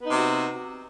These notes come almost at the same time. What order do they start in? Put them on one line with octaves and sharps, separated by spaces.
B3 D#4 C3 F#4